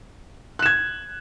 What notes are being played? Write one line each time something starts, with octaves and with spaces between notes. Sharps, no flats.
F#6 G#6 E7